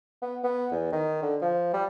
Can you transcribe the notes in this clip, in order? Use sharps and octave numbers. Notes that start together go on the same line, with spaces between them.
B3
B3
E2
D#3
D3
F3
G3